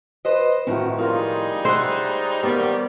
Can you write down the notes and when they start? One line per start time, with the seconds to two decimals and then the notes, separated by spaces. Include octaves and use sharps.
0.25 B4 C5 D#5
0.67 A2 D#3 F3 C4 E4 F#4
0.99 G3 G#3 D#4 F4 A#4
1.65 C5 E5 F#5
2.43 D#3 G3 A#3 B3 D5